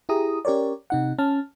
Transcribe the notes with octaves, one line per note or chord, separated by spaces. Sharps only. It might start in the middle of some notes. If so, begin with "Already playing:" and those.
E4 G4 G#4 A#5 D#6
C#4 G4 A#4 C#5 D5
C3 D#4 F#5
C#4 A5 F6